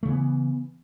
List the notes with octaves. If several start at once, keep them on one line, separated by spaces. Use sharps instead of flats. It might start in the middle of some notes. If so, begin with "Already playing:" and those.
C#3 E3 A3 B3